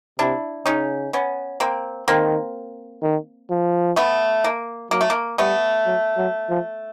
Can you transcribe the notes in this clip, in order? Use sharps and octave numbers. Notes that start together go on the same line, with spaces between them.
C3 D4 E4
C#3 C#4 D#4
B3 C#4
A#3 C4
D#3 A#3 C4
D#3
F3
A3 B3
A#3
F#3 A#3
A3
A#3
G3 A3 B3
F#3
F#3
F3